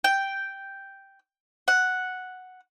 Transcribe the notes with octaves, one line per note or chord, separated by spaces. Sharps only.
G5
F#5